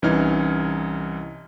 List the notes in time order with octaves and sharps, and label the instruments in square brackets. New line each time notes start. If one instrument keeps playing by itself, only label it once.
[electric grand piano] C2 E3 C#4 D#4 F6 G#6